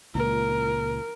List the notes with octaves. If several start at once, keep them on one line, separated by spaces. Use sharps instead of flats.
C#2 A#2 A#4